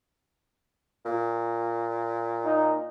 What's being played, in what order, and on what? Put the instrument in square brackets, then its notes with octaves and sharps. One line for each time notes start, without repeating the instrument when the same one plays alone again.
[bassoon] A#2
[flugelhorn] D#4